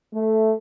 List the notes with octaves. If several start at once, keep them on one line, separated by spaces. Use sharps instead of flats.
A3